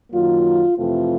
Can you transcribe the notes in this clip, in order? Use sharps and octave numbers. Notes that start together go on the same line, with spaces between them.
F#2 D#3 F#3 A#3 F4
F2 C3 E3 A3 C4 F4